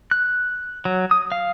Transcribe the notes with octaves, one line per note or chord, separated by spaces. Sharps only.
F#6
F#3
D#6
F5